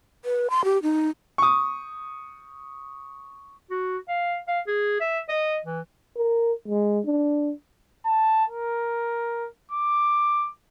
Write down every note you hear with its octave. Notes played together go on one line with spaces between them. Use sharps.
B4
C6
G4
D#4
C#6 D#6
F#4
F5
F5
G#4
E5
D#5
E3
A#4
G#3
D4
A5
A#4
D6